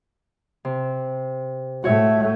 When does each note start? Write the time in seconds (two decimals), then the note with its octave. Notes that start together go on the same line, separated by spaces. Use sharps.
0.65 C3
1.84 A2 A3 F#4 C#5 E5